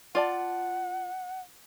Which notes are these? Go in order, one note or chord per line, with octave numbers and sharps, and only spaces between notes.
F4 D5 F#5 A5